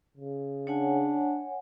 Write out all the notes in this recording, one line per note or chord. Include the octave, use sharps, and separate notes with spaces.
C#3
D4 C#5 F#5 G#5